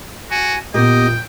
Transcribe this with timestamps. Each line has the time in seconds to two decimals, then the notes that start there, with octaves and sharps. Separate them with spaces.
0.31 F#4 G#5
0.74 A#2 B3 G4 D#5 G5